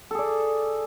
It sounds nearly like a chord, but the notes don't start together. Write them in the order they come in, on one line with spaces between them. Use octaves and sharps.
A4 G#4 D5